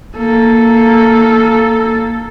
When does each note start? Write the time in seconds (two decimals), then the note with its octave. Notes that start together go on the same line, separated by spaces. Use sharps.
0.17 A#3 A4